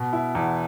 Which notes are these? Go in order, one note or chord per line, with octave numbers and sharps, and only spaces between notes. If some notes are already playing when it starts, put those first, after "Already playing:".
Already playing: B2
E4
E2